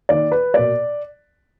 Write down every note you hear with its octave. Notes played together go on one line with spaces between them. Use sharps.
D#3 A#3 D5
B4
B2 A#3 D5